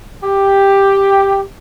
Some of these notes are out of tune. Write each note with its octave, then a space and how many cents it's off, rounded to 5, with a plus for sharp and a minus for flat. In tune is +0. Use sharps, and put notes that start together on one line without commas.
G4 +5